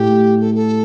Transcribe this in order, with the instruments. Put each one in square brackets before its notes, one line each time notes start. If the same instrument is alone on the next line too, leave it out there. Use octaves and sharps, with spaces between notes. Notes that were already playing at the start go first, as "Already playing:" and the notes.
Already playing: [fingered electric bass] A2 [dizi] G4
[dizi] A4
A4